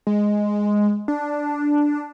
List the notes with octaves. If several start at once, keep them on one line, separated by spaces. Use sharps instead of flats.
G#3
D4